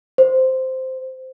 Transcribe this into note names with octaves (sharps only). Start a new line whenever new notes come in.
C5